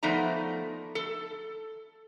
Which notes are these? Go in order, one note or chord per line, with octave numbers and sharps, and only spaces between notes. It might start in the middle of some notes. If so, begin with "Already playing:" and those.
F3 A3 B3 D#4 D5 A#5
A4